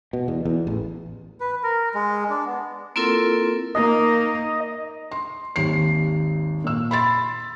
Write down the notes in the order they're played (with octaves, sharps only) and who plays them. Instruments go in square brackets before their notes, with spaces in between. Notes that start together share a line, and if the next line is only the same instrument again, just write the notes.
[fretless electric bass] B2
E2
E2
A1
[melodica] B4
A#4
G#3
D4
B3
[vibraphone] A#3 C4 E4 F4 A4 A#4
[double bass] A#3 D#4 [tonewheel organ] D#5
[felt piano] C6
G#1 D#2 C7
A#2 E6
B5 C6 A6